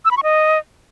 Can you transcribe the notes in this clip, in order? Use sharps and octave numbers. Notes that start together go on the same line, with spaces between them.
E6
B5
C#6
D#5